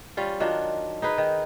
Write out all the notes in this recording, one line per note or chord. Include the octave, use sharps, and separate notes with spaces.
G3 C#4 F4
D#3 F#3 D4 F4
D#4 G#4 B4
D#3